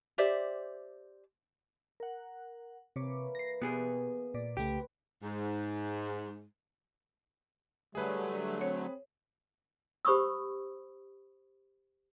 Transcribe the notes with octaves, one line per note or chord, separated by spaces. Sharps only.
G4 C5 D5 E5
A#4 F#5
C3 E3 A#3 C#5 D6
A#6 C7
B2 B3 G4 G#4
A#2 D5
C2 C#3 A3 C4 G4 B4
G#2
D3 F#3 G3 A3 G#4 B4
C4 C#5
G4 C5 B5 C#6 D#6 E6